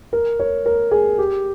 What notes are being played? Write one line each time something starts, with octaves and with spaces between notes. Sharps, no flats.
A#4
C#5
A#4
G#4
G4